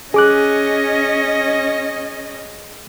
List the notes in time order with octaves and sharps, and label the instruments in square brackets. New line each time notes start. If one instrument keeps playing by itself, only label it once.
[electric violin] C#4 D#5 [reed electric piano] G#4 D6 F#6